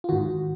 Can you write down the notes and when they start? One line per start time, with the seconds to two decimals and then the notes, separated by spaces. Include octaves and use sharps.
0.04 F4
0.09 G#2 D#3 F#4